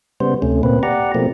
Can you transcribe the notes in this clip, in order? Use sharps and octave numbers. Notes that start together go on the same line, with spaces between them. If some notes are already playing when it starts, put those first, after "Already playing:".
C#3 G3 B3 C5
D2 C3 A3 C#4
A#2 A#3 C4 B4
G4 D5 F#5 A#5
B2 F3 A3 A#3 C4